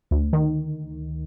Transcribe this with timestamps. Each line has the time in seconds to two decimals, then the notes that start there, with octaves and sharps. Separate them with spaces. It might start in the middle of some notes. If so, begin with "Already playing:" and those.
0.11 D2
0.33 D#3